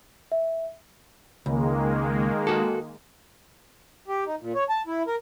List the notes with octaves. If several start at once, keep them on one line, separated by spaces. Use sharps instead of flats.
E5
C#2 D#3 G#3 A#3
F#4 A4
G4
D#4
A#2
C#5
A5
E4
A#4